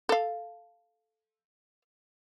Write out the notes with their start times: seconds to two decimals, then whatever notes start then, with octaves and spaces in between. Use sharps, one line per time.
0.09 A4 F5